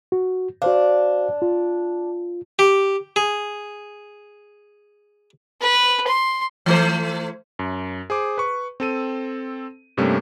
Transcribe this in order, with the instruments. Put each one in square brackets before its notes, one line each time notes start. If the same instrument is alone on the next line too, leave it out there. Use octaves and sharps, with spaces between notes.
[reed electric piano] F#4
[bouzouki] D4 [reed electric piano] F#4 C5 F5
[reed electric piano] F4
[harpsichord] G4
G#4
[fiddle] B4
C6
[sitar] E3 A3 C5
[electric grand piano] F#2
G#4 C5 D6
B4 C#6
C4 A4 D#7
G2 C3 G3 A3 A#3 C#4